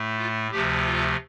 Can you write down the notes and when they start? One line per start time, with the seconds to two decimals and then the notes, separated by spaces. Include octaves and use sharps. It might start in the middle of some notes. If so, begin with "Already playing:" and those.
Already playing: A2 A3
0.18 F4
0.51 D2 C3 F3 A3 G4
0.84 F4